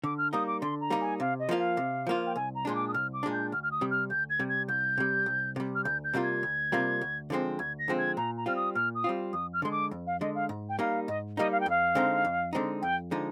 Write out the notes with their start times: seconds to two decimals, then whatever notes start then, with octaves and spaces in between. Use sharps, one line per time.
0.04 D3 D6
0.18 F6
0.33 G3 A#3 D#4 D#6
0.47 D6
0.61 D3 C6
0.81 A#5
0.90 G3 A#3 D#4
1.01 G#5
1.20 C3 F5
1.40 D#5
1.49 F3 A#3 F4
1.58 F5
1.77 C3
2.07 F3 A#3 F4
2.27 G5
2.36 C2 G#5
2.55 A#5
2.65 A#2 G#3 D4 C6
2.75 D6
2.88 D#6
2.94 C2 F6
3.13 D6
3.23 A#2 G#3 D4
3.33 G6
3.52 D2 F6
3.63 F6
3.71 D#6
3.81 C3 G3
3.91 F6
4.10 D2 G6
4.30 G#6
4.39 C3 G3
4.49 G#6
4.68 C2 G6
4.98 C3 G3
5.26 C2
5.56 C3 G3
5.75 F6
5.84 D2 G6
6.04 G6
6.14 C3 G3 A#3 F4
6.23 G#6
6.43 D2
6.72 C3 G3 A#3 F4
7.01 D2
7.30 D3 F3 G#3 C4
7.59 D2 G#6
7.79 A#6
7.88 D3 F3 G#3 C4
7.98 G#6
8.17 A#2 A#5
8.37 A#5
8.46 G3 C4 F4 F6
8.56 D#6
8.75 A#2 F6
8.95 D#6
9.04 G3 C4 F4
9.33 F2 D#6
9.53 F6
9.62 D3 G#3 C6
9.72 D6
9.91 F2
10.07 F5
10.20 D3 G#3 D#5
10.35 F5
10.49 G#2
10.69 G5
10.79 G3 A#3 D#4 F5
11.08 G#2 D#5
11.37 G3 A#3 D#4 D#5
11.52 F5
11.60 G5
11.66 F2 F5
11.95 D3 G#3 C4 D#4
12.25 F2
12.53 D3 G#3 C4 D#4
12.82 F2 G5
13.11 D3 F3 G#3 D#4